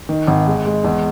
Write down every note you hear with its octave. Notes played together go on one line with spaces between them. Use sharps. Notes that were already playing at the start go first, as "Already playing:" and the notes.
D#3
G#1
G#3
G#3
E2